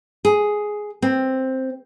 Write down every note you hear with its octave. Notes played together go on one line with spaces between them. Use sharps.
G#4
C4